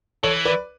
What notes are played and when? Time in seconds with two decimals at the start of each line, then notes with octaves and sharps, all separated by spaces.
0.23 E3 A4 C#5
0.45 B4 D5